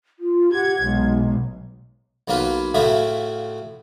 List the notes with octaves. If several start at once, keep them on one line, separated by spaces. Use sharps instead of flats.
F4
G4 F#5 G#6
B1 G#3
B1 F#3 A#3 F4 B4
A2 C#3 A3 F4 F#4 E5